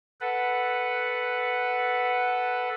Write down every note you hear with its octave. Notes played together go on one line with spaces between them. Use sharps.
A4 B4 F#5